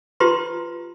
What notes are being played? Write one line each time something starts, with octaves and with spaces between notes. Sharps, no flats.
F4 G4 B4 A#5 C6